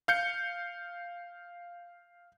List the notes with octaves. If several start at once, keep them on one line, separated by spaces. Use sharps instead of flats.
F5 G6 C#7